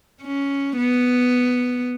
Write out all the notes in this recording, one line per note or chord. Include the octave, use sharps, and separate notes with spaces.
C#4
B3